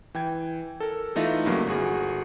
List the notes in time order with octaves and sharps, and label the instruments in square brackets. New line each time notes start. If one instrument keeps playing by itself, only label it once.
[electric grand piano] E3 G5 G#6
A4 A#4
E3 A3 D#4 F4 E5 A#6
G2 C#3 F#3 A#3
G1 F#4 G#4